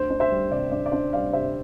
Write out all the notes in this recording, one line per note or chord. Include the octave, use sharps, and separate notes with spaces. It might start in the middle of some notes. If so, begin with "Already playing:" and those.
Already playing: D2 C5
D4
C5 E5
G3
C3 D5
D2 D5
D5
D4 C5
G3 D5 F5
C3 C5 E5